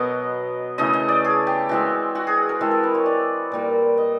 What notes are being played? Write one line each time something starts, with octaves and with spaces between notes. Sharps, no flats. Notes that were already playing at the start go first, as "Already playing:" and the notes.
Already playing: B2 F#3 B3 D#5
C#3 E3 A3 D#5
D#5
D5
G#4
G4
E3 G#3 C4 F#4
F#4
G#4
A#4
E3 G#3 C4 A4
A#4
B4
C#5
D5
A#2 G3 A#3
D#5